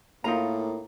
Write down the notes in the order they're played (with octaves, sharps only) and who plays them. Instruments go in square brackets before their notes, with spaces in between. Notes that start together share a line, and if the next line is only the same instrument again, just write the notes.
[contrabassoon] A2 [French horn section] A#3 [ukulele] D#4 F4 A#5